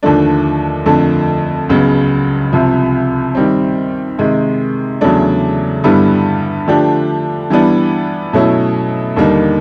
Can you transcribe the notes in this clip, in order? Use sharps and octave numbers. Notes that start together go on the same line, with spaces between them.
D#2 D3 F3 A3 D4
F2 D3 F3 A3
C#2 C#3 F#3 B3
C2 C3 F3
D#3 G3 C4
C3 D#3 G#3
E2 C#3 F#3 A3 D4
G2 D3 G3 B3 E4
D3 F3 A3 D4 G4
E3 G3 B3 D4
B2 F#3 A3 C#4 E4
D#2 D3 G3 A#3 D#4